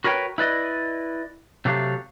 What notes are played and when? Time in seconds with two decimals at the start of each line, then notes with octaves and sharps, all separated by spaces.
0.04 F#4 A#4 B4 C#5 G5
0.38 E4 B4 D5 D#5
1.65 C3 F#3 A3 G4 F5